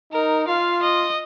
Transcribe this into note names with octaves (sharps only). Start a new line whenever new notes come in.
D#4 A#4
F4 F5
D#5